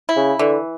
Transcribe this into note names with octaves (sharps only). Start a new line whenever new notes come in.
E4
C#3
D3 E3